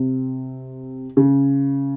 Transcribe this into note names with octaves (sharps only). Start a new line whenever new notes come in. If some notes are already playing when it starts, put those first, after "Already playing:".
Already playing: C3
C#3